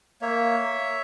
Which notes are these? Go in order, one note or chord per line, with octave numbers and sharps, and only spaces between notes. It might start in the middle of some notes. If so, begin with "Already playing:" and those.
A#3 C#5 E5